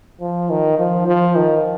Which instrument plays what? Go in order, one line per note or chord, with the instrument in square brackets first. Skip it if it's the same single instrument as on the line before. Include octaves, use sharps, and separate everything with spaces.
[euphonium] F3
D#3
F3
F3
D#3